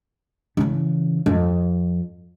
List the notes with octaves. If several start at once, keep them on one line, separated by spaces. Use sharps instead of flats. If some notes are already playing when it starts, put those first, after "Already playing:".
C#3 E3
F2